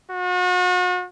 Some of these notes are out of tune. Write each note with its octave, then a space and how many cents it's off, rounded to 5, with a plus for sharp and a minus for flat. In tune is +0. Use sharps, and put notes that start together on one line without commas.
F#4 -40